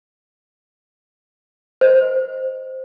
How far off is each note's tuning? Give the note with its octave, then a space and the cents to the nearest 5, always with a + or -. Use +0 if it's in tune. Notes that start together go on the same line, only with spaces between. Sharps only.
C5 +0 D#5 +0